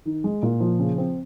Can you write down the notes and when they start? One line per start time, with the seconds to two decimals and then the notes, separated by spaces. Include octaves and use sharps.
0.06 D#3
0.24 G#3
0.43 A#2
0.61 F3
0.79 C#3
0.98 C4